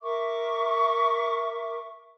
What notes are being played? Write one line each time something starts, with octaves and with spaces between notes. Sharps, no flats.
A#4 E5 C#6 D6